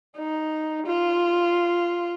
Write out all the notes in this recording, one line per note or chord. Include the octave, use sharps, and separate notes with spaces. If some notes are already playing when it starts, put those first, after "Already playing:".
D#4
F4